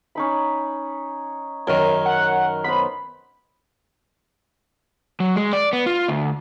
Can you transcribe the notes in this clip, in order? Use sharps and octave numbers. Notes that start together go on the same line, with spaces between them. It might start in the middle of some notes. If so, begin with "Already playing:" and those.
C#4 D#4 B5
F#2 D#3 A#4 C#5
F#5
B3 C5 B5
F#3
G#3
D5
B3
F4
D2